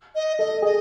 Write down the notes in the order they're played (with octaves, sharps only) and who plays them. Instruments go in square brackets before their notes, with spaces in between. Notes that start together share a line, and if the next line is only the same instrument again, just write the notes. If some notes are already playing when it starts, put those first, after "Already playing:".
[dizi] D#5
[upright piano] A4 [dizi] D#5
[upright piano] G#4 [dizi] D#5